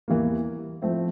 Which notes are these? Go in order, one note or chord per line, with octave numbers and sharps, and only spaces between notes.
E2 E3 G3 A#3
F3 A3 C4 E4